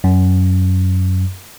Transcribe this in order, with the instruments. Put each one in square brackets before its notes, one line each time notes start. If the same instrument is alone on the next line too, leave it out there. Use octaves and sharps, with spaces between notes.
[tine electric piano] F#2